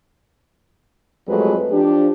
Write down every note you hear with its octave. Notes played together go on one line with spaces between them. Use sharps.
F2 F#3 G#3 A3 G4 B4
F3 D4 G4